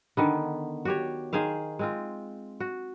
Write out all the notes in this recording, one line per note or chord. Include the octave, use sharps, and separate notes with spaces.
D3 D#3 B3
F#4 G4 C#5
D#3 G#4 C5 F5
G#3 C4 F4
F#4